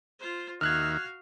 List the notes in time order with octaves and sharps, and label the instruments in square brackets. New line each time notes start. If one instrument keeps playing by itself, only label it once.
[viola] F4 C5
[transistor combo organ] D#2 D#3 E5 [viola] F#4 F5 [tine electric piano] F6 F#6 G#6